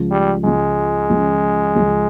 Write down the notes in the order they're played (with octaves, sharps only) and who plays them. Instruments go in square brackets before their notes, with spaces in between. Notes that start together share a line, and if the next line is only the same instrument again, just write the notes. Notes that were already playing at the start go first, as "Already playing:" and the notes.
Already playing: [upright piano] C#2 C#3 F3
[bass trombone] G3
[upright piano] C#2 C#3 F3 [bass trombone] G#3
[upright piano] C#2 C#3 F3
C#2 C#3 F3